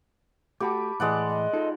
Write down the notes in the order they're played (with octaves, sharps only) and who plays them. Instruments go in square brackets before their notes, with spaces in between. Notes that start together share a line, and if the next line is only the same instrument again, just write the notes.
[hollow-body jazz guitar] A3 F#4 [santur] G4 [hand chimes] A5 B5 D6
[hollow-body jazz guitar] A2 E3 [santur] G#3 D5 F#5
[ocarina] D#5
[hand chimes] D#4 F4 [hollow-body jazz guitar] A4